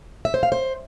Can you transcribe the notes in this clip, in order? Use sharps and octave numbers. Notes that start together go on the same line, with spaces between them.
E5
C5
F5
C5